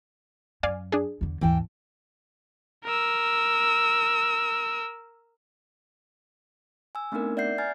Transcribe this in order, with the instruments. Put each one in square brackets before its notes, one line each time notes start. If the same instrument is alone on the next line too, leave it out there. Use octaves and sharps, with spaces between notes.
[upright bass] F#2 [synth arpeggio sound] D5 F5 G#5
[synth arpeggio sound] D4 G#4
[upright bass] E2 D3
[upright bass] G#1 D#2 [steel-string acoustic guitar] E3 G5 A5
[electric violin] A#4 E6
[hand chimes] G#5 E6
A3 B3 C4 D4 D#4 A#4
D5 E5 F#5 G6 C7
G#5 A#5 F6 G#6 A6